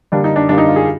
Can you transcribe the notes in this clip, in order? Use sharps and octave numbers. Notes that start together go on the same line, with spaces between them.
D3 G3 A#3 D4
D#4
D4
D3 G3 A#3 D4
D#4
F4
G#4